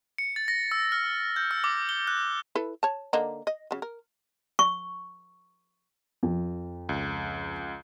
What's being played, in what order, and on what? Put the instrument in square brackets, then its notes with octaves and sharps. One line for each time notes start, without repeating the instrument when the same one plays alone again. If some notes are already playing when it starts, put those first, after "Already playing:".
[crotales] C#7
A6
A#6
E6
F6
G6
E6
D6
G7
F#6
[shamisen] E4 A4 B4
C#5 A5
D3 A#3 D#4
D#5
C#3 F#3
A#4
[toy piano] C#6
[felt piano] F2
[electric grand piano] C#2